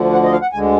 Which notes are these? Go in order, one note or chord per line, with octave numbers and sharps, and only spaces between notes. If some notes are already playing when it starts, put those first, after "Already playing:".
Already playing: D2 D3 F3
F#5
D#5
F5
F#5
D2 D3 G#3 G#5